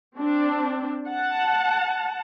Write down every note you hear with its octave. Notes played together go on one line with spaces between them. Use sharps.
C4 D4
F#5 A5